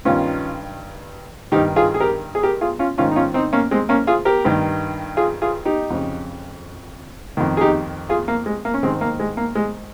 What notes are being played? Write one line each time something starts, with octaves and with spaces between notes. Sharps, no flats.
G2 D#3 C#4 F4
G2 D#3 D#4 G4
F4 G#4
G#4
G4 A#4
G#4
G4 A#4
F4 G#4
C#4 F4
G#2 D#3 C#4 F4
D#4
C#4 F4
C4 D#4
A#3 C#4
G#3 C4
A#3 C#4
F4 G#4
G4 A#4
G2 D#3
F4 G#4
F4 G#4
D#4 G4
F2 C#3
F2 D#3
G#4
D#4 G4
F4 G#4
A#3
G#3
A#3
C#4
G#2 D#3 G#3 C4
A#3
G#3
A#3
G#3